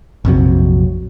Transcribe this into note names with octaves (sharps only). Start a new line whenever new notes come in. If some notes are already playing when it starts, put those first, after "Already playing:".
A#1 F2 C3 F#3